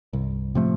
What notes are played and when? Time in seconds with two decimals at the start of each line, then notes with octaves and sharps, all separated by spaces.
0.13 C2 G2
0.55 A2 C3 F3 A3